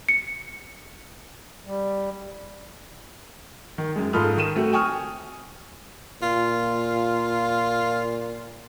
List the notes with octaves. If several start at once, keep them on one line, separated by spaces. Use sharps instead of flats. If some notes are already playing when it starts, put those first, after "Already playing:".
C#7
G3
D#3
F#2 G#3
G#2 F4 A4 B5 D#6 F6
D#3 D#7 E7
A3 C4 F#4
G5 G#5 C#6 D#6 F6
A#2 F4